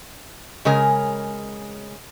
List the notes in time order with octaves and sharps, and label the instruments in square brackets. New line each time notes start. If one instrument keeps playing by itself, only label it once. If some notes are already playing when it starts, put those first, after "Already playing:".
[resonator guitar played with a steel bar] C#3 G#3 A#4 G#5